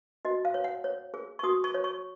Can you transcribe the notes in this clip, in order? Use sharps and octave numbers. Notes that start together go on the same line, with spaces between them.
F#4 D#5
F5
C#5
F#5
C#5
G#4
C#6
F#4 D#6
C#6
C#5
C#6